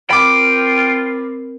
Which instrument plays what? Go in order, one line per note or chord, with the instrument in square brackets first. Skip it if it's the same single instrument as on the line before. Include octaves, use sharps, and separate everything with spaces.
[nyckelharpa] C4 A#4 [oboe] F4 [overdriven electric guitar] G5 [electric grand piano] B5 D6